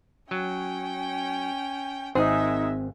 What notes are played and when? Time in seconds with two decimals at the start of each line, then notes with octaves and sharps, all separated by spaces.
0.31 F#3 C#4 G5
2.15 G#1 G#3 C4 D#4 G#4 E5